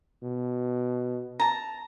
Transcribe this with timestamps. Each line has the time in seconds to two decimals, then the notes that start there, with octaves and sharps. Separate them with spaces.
0.23 B2
1.40 A5 A#5